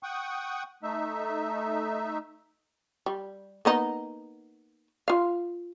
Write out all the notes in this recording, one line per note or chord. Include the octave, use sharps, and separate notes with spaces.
F#5 G5 C#6 D#6
A3 D#4 E5
G3
A#3 B3 D#4
F4 F5